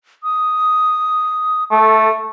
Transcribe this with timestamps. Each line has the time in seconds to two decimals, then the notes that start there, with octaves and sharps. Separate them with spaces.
0.23 D#6
1.71 A3 A4